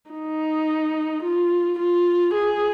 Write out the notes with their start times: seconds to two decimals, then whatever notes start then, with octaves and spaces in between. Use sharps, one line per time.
0.11 D#4
1.23 F4
1.79 F4
2.34 G#4